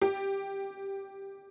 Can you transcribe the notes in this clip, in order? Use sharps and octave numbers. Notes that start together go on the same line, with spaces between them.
G4